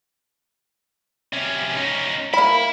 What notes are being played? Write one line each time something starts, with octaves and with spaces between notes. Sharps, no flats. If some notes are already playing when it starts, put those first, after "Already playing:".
C3 C#4
C#4 D#4
A#3 E4 B5